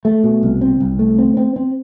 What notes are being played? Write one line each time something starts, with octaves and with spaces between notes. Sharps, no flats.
A3
B2
C2
C4
C2
A3
C4
C4
C4